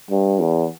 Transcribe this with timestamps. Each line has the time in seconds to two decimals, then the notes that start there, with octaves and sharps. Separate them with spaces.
0.10 G2
0.40 E2